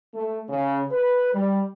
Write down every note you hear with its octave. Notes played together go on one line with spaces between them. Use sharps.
A3
C#3
B4
G3